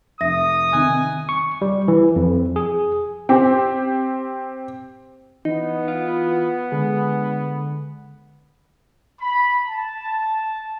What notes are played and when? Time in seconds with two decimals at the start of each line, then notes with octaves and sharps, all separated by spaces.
0.21 F1 E5 D#6 A#6
0.73 C3 D#3 G#5 F#6
1.29 C#6
1.62 G3
1.88 E3
2.16 F2
2.56 G#4
3.29 C4 G4
5.45 E3 B3 D#4
5.88 F4
6.72 D3 G#3
9.20 B5
9.66 A5